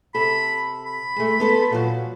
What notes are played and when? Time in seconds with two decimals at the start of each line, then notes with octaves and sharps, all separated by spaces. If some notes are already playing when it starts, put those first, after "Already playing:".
0.14 C3 A4 B5
0.85 B5
1.16 G#3 A3
1.40 B3 A4 C5
1.71 A#2 F3 F#3